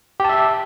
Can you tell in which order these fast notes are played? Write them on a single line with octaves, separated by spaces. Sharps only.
G4 A5 E5